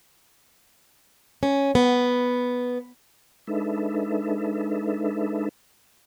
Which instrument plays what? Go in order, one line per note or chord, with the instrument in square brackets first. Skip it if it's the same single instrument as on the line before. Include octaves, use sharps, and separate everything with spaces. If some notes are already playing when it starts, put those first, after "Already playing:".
[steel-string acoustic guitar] C#4
B3
[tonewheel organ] G#3 D4 D#4 A4 B4 E5